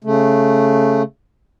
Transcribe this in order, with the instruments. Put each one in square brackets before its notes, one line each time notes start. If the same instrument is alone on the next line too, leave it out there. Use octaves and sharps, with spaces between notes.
[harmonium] C#3 A3